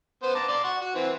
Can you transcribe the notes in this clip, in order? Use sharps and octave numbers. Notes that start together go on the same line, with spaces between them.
B3 C5
A5 A#5 D6
D5 C6
F#5 C#6
F#4
E3 C4